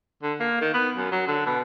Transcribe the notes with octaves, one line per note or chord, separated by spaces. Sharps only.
D3
A#3
D#3
B3
F#2
F#3
D3
B2